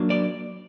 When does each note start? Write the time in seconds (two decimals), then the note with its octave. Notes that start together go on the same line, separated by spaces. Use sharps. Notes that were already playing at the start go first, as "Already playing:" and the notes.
Already playing: F#3 A#3 D4
0.10 D5